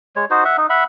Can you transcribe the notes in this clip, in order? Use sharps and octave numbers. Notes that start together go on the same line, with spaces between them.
G#3 C#5
D#4 F#4 C5
E5 F#5
D#4
E5 F#5 B5